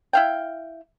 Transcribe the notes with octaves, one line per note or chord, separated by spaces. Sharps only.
E4 F5 G5